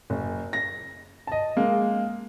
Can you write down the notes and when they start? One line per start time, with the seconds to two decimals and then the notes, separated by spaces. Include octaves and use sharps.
0.10 F#1
0.53 A#6
1.27 D#5 A5
1.57 G#3 A#3